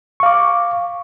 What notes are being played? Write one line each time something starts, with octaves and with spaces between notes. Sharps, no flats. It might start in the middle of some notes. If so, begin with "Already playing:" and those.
F5 C#6 D6